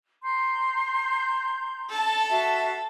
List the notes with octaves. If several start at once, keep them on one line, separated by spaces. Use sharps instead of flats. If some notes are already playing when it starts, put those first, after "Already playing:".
A#5 C6 G6
A4 A5
F#4 E5 F5